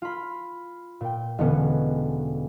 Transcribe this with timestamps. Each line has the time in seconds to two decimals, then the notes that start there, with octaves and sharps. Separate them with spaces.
0.02 F4 B5
1.01 A#2 G5
1.38 E1 D3 B3 C#4 C#7